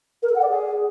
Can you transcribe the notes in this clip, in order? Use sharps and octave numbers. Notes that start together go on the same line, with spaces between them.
A#4
A4
F#5
D5
G#4